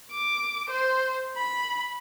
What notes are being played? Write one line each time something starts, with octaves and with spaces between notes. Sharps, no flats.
D6
C5
B5